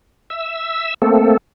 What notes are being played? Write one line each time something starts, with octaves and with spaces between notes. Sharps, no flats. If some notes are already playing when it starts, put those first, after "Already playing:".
E5 E6
A3 A#3 C4 A4